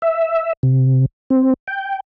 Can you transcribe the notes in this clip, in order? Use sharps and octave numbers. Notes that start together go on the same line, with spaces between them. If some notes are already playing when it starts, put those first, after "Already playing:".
E5
C3
C4
G5